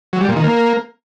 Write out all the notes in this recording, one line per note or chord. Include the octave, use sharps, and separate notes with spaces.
F#3
G3
A#2
D#3
A#3